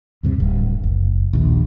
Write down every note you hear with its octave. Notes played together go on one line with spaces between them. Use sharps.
D2 G2 C3
D1 G2
F#1
A#1 D#2